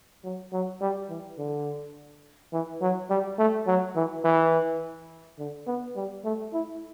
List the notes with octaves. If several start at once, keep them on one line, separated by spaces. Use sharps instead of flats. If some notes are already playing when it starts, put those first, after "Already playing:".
F#3
F#3
G3
E3
D3
E3
F#3
G3
A3
F#3
E3
E3
D3
B3
G3
A3
E4